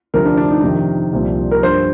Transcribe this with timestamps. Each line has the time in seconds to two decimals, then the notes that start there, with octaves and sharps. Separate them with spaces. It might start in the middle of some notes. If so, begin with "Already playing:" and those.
0.14 D2 C3 F3 A#4
0.26 D4
0.37 D4
0.51 D#4
0.63 F2 C3 D#3 D#4
1.13 C2 A#2 F3
1.51 A#4
1.63 G2 F3 C5